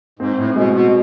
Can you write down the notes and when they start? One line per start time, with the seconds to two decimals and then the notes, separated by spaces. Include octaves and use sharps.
0.19 G#2 C4
0.38 A2
0.56 B2 G#3
0.74 B2